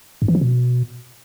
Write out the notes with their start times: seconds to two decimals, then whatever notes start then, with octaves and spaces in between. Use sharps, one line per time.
0.22 G2
0.28 E3
0.35 F3
0.41 B2